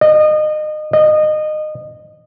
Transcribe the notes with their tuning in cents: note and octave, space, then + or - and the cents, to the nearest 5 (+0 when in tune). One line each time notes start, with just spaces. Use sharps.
D#5 -30
D#5 -25